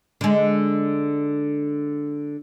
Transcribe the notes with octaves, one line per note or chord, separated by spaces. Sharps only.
D3 G#3